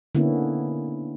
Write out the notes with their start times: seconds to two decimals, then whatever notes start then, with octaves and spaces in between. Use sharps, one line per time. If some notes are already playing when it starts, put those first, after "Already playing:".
0.15 D3 A#3 B3 C#4 E4